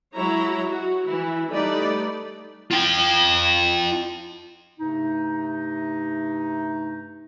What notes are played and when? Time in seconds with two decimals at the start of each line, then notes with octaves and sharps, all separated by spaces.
0.15 F#3 G#3 E4 C#5 A#5
0.69 F#4
1.06 E3 E4
1.51 G3 A3 D#4 B4 D5 B5
2.71 F4 G5
4.78 G2 C3 A3 D#4